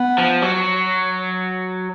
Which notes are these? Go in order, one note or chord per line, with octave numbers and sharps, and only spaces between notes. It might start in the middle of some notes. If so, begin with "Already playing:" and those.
Already playing: B3
F3
F#3